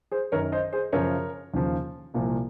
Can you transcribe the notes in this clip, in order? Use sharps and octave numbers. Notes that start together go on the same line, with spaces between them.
G#4 C5
F#2 D#3 A#4 C#5
C5 D#5
G#4 C5
F#2 C#3 F3 A#4 C#5
D#2 C#3 F3
C2 A#2 F3